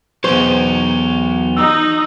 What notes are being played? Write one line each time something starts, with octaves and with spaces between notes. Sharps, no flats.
E2 F#3 B3 C5 C#6 F7 G7
D#4 E6